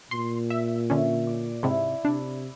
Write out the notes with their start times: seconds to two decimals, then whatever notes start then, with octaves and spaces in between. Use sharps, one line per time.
0.11 A#2 C6
0.50 E5
0.90 D3 C#4 E5
1.27 D5
1.63 G#2 C3 E4
2.05 C3 D4